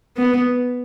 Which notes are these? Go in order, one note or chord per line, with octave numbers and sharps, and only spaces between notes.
B3